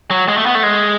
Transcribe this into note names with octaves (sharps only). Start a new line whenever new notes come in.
F#3
G#3
A3
B3
A3
G#3